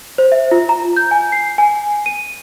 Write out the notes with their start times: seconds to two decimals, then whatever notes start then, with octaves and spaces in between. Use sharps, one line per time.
0.18 C5
0.32 E5
0.51 F4
0.69 A#5
0.97 G6
1.11 G#5
1.32 C7
1.58 G#5
2.06 D#7